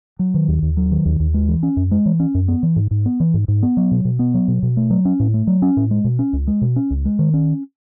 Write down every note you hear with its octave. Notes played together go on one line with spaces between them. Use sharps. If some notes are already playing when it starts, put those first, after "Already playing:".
F#3
D#3
D#2
D#2
F#3
D#3
D#2
D#2
G#3
E3
C#4
F#2
G#3
E3
C#4
F#2
B3
E3
G#2
G#2
B3
E3
G#2
G#2
B3
F#3
B2
B2
B3
F#3
B2
B2
A3
F#3
C#4
A2
A3
F#3
C#4
A2
G#3
B2
C#4
C#2
G#3
B2
C#4
C#2
G#3
D#3
C#4